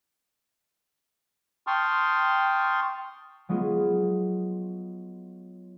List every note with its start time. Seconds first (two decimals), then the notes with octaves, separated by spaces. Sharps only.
1.67 G5 A5 C6 C#6 D#6 F6
3.49 F#3 G#3 B3 F4 G#4